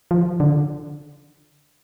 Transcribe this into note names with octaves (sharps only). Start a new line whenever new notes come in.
F3
D3